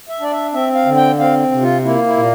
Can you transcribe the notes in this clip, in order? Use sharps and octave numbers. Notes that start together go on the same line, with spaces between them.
E5
D4 D5
E5
C4 E5
F5
D3
G5
C4 F5
C3
F4
A#3 E4
E4
A#2